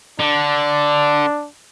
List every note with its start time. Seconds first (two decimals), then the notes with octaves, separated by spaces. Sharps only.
0.20 D3 D4